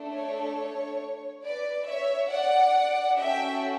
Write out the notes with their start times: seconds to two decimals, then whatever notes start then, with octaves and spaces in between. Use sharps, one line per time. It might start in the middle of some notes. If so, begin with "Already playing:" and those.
Already playing: A3 D4 A4
0.13 C#5
1.44 B4 D5
1.87 C#5 E5
2.31 D5 F#5
3.18 C#4 F#4 A4 E5 G5